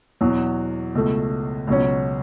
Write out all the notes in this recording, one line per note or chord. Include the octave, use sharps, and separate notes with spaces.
E2 B2 F#3
C#2 B2 A3
C#2 B2 F#3 C#4